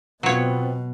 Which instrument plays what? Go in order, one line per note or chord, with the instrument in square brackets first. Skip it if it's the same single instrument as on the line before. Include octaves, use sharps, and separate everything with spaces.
[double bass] B2 [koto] F#3 C#5 [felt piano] B3 F4 [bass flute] C4